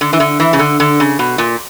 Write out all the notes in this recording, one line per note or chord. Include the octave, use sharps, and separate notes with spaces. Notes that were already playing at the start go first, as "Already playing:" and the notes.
D3
E3
D3
E3
C#3
D3
D3
C#3
B2
A#2